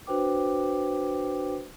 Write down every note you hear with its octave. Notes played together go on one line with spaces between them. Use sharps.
D4 F#4 B4 C5 G5 D6